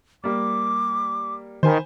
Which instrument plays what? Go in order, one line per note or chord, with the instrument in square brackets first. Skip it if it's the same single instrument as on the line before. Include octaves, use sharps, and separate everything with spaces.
[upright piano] G3 A#3 [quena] D6
[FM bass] D#3 [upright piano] C5 G#5 B5